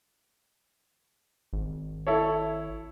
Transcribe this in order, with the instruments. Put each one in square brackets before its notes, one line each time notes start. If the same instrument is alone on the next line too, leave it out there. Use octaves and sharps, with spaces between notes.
[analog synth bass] G#1
[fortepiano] E4 A4 C#5